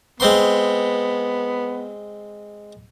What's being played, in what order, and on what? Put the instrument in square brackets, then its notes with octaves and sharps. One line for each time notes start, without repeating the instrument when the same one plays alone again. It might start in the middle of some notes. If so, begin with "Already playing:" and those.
[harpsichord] G#3 C4 C6 [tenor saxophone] B3